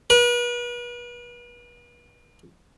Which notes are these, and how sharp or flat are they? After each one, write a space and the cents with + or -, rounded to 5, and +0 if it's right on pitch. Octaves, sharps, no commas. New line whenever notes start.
B4 -40